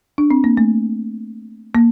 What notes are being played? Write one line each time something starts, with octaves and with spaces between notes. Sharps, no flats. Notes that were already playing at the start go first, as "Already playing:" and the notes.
D4
C4
A#3
A3
A#3